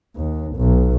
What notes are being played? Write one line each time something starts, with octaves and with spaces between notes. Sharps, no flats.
D#2
B1